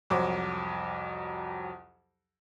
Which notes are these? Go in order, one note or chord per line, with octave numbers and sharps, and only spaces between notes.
C2 F2 F#3 C5 D6